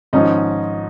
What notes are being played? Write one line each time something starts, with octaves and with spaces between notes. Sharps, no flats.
G#1 G#2 F3 C#4 D#4